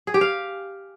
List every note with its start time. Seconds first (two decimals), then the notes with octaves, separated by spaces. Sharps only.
0.07 G#4
0.14 G4
0.21 F5